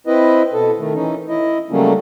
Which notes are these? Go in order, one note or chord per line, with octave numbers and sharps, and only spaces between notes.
C4 E4 B4 D#5
B2 A4
D#3 A3
E3 C#4 D#4
E4 D#5
C#3 F#3 G3 A3 A#3 C#4